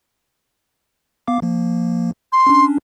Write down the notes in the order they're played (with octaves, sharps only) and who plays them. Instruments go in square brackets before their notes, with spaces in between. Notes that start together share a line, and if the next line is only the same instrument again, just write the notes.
[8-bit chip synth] B3 F5 D6
F3 A#3
[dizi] C6
[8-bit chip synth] C#4 D4